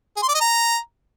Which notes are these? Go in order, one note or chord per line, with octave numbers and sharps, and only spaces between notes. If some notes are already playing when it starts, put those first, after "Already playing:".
G#4
C6
D5
D#5
A#5